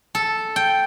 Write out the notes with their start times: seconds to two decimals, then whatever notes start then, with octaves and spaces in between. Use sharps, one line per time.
0.15 A4
0.56 G5